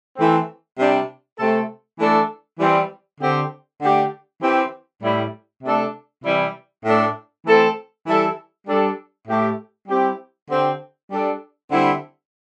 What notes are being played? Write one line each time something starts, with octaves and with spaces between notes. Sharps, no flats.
E3 A3 C4
C3 G3 D4 G4
C3 A3 C4 A4
E3 A3 D4 A4
E3 G3 C4
D3 C4 G4
D3 A3 D4 G4
E3 C4 G4
A2 G3 E4
C3 A3 D4 A4
C3 E3 G3 E4
A2 A3 D4 A4
E3 A3 C4 A4
E3 G3 E4 A4
G3 D4 A4
A2 A3 E4 G4
G3 C4 E4 G4
D3 C4 G4
G3 D4 A4
D3 G3 C4 E4